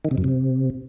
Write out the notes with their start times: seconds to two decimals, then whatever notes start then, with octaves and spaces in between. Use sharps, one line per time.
0.05 D#3
0.11 C3
0.18 F#2
0.24 C3